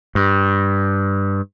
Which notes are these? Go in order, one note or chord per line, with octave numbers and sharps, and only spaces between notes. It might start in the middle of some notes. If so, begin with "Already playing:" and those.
G2